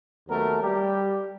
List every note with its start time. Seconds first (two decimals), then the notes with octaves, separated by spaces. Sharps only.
0.28 D#2 F#3 A3 B3 A4 A#4
0.62 G3 G4